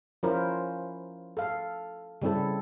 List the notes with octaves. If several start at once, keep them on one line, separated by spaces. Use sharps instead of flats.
F3 C#4 E4 F4 A#4 C5
A4 F5
C#3 G3 C4 E4 A4